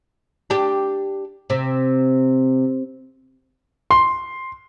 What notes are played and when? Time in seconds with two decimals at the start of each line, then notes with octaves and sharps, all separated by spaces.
0.50 D4 G4
1.50 C3
3.91 C6